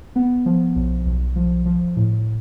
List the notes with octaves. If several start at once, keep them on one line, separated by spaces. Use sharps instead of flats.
B3
F3
B1
B1
F3
F3
A2